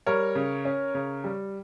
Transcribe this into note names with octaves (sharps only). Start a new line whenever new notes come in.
G3 A#4 C#5
C#3
C#4
C#3
G3